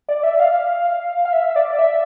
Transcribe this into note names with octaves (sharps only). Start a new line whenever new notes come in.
D5
E5
F5
F5
E5
E5
D5
E5